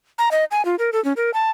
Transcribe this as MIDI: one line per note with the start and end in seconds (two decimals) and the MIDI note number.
0.18 0.29 82
0.31 0.45 75
0.51 0.64 80
0.65 0.76 65
0.79 0.90 70
0.93 1.03 69
1.05 1.13 61
1.17 1.31 70
1.34 1.50 81